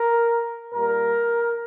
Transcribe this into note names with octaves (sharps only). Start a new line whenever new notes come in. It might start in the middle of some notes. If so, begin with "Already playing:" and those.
Already playing: A#4
A#2 G3 A#3 A#4